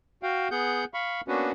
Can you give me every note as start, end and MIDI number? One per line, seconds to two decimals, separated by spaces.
0.23 0.48 66
0.23 0.48 77
0.23 0.48 79
0.51 0.85 59
0.51 0.85 68
0.51 0.85 78
0.51 0.85 91
0.94 1.21 77
0.94 1.21 83
0.94 1.21 85
1.28 1.52 58
1.28 1.52 59
1.28 1.52 61
1.28 1.52 62
1.28 1.52 66
1.28 1.52 71